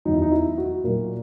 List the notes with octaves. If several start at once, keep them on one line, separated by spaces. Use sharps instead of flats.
E2 D#3 F#3 D#4
E4
D#4
E4
F#4
A#2 F#3 A#4